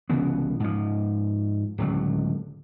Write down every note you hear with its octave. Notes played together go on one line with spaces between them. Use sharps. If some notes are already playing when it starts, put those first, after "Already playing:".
C2 C#3 E3 B3
G#2 F3
D1 C#2 F#3